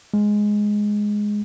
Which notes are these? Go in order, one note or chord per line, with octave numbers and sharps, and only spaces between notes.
G#3